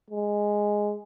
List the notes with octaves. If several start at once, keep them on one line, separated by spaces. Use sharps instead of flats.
G#3